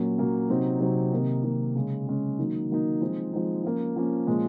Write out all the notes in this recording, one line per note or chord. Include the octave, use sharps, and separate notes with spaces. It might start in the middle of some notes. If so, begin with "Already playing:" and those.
Already playing: A#2 F#3 A#3 C#4
A#2 F#3 A#3 C#4
C3 F#3 C4 D#4
C3 F#3 C4 D#4
C3 D#3 A#3 D#4
C3 D#3 A#3 D#4
C#3 G#3 C#4
C#3 G#3 C#4
D#3 F#3 A#3 D#4
D#3 F#3 A#3 D#4
F3 G#3 C4 D#4
F3 G#3 C4 D#4
F3 A#3 C#4
F3 A#3 C#4
A#2 F3 G#3 C#4